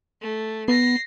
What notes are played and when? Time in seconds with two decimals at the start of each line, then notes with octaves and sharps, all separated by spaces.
0.21 A3
0.68 B3 A#6 C7